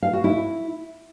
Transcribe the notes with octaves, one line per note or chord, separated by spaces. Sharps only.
F5
F#4
E4